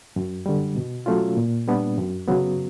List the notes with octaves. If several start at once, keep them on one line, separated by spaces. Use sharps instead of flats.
F#2
D3 G3
B2
F#3 A3 C#4 F4
A#2
G3 B3 D4
F#2
C#3 F#3 B3